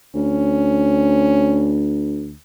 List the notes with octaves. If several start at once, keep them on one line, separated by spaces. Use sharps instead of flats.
D2 C#4